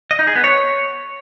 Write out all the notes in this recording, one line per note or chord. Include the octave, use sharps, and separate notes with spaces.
D#5
D#4
G#4
B3
C#5